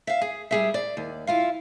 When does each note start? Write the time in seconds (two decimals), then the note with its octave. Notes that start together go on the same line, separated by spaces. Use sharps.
0.07 E5 F5
0.21 G#4
0.51 G3 G#4 E5
0.74 D5
0.97 D#2
1.27 E4 F4 F5